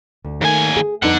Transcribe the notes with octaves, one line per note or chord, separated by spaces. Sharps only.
D2
D#2 D#3 A3 G#5
G#4
F2 D3 B3 D#4 F#5